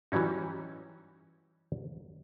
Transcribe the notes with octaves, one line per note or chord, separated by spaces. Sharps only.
E3 F#3 G3 C#4 D#4